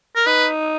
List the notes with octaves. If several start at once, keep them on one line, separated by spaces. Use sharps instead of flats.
A#4
D#4 B4